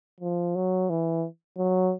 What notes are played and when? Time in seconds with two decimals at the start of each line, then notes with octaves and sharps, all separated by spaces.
0.20 F3
0.56 F#3
0.90 E3
1.57 F#3